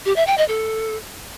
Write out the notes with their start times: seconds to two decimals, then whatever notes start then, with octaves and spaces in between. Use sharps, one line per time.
0.06 G4
0.16 E5
0.27 G5
0.38 D#5
0.48 A4